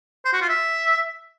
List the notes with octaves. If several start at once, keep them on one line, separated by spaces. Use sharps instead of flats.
C5
F#4
F4
E5